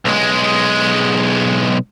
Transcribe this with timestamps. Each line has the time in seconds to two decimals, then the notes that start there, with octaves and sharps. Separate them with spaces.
0.05 B1 G#3